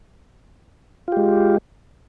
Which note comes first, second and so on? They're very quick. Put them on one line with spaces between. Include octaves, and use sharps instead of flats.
F4 G4 G#3